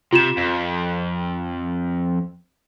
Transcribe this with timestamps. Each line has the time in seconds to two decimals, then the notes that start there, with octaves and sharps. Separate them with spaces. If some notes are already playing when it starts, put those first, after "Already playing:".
0.13 C3 F4 E7
0.37 F2